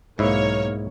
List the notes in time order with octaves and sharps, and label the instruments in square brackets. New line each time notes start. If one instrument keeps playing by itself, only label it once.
[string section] B1 A#3 C#5 [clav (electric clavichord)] G#2 E4